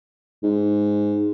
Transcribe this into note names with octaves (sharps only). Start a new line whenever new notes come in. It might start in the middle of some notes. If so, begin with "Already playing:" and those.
G#2